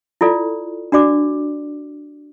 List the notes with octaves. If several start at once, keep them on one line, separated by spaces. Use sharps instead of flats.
E4 F4 A4 D5
D4 F#4 D5 D6